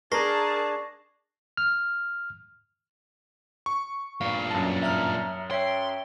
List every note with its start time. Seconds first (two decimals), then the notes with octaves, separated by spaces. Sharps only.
0.12 D4 G#4 A#4 A5 C#6 A#6 C7
1.57 F6
3.66 C#6
4.21 G2 A#2 F5
4.51 F#2 A5
4.82 E5 A#5 F6
5.51 C#5 E5 G5 C6